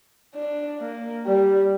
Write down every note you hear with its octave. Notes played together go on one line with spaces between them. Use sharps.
D4
A#3
G3